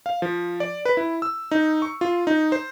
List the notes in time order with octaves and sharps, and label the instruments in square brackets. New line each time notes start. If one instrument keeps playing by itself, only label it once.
[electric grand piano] F5
F3
D5
B4
E4
E6
D#4
C#6
F4
D#4
C5